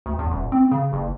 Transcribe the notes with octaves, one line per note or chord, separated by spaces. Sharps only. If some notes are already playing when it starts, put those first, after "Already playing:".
D2
E2
D#1
C4
C#3
F#1